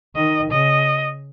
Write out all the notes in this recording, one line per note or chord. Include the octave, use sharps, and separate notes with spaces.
D#3 D#5
C#3 D#5